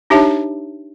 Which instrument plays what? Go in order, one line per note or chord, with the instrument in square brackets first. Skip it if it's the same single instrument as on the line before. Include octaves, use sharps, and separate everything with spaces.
[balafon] D4 D#4 G4 C#5 E5 A5